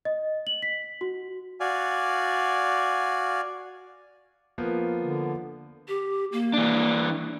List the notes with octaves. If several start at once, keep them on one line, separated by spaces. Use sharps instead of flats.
D#5
F#7
B6
F#4
F#4 D5 F5 G#5
F3 A#3 B3
D3
G4
A#3
E3 D4